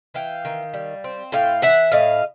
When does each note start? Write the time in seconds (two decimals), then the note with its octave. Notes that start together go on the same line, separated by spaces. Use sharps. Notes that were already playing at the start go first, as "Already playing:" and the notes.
0.14 E3 F5 G5
0.45 D#3
0.74 G3
1.04 C4
1.32 A2 F5 G5
1.62 E3 E5 F#5
1.92 A2 D#5 F5